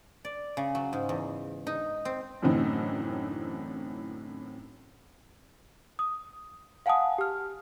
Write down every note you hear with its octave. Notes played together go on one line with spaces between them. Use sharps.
D5
C#3
F#3
G#2
E2
D#4
C4
F#2 A2 D3 E3 C4 D#4
D#6
F5 F#5 G#5 A5 D#6
G4 F6